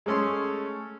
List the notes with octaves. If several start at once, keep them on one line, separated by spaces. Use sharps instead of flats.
G#3 A3 C#4 A4 C6